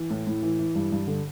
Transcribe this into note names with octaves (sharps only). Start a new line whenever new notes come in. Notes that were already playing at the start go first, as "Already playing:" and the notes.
Already playing: E3
A2
A2
E3
E3
G2
G2
D3